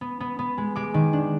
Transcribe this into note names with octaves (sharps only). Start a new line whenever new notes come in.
B3
B3
B3
G#3
G#3 D6
D#3
D4